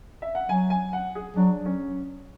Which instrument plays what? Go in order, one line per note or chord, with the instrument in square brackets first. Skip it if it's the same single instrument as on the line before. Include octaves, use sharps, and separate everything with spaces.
[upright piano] E5
F#5
[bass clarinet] F#3 [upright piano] G#5
[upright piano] G#5
F#5
G#4
[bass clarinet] F#3 [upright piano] D4
[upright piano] C#4